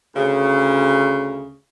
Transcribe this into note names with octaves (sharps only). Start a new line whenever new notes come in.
D2 C#3